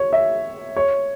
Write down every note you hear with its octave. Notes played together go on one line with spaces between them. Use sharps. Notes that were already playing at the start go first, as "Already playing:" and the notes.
Already playing: C#5
E5
C#5